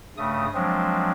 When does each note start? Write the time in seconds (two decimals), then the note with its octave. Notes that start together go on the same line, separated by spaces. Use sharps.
0.17 G2 C#3 A3 D#6
0.54 F3 F#3 G#3 C4 D4